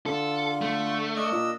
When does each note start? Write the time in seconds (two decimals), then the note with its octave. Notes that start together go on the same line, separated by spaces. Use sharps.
0.06 D3 F4 A4
0.62 A3
1.16 D4 D#5 E6
1.32 A#2